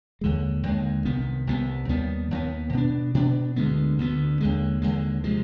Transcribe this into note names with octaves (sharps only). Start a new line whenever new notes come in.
D#2 D3 G#3
D#2 D3 G#3
C2 C3 D#3 B3
C2 C3 D#3 B3
D#2 D#3 G3 B3
D#2 D#3 G3 B3
B2 B3 D4
B2 B3 D4
D2 D3 G#3 B3
D2 D3 G#3 B3
D#2 D3 G#3
D#2 D3 G#3
C3 F3 G#3